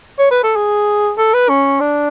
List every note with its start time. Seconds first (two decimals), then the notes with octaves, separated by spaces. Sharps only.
0.18 C#5
0.31 B4
0.43 A4
0.56 G#4
1.17 A4
1.34 B4
1.49 C#4
1.80 D4